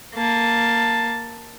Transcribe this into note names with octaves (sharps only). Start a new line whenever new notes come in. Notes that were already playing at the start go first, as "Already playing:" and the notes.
A#3 A5